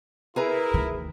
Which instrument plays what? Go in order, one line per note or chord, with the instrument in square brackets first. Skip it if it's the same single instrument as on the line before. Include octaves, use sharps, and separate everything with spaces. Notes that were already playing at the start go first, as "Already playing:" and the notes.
[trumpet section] E4 A#4 [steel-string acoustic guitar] G#4 B4 A#5
[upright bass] D2 D#3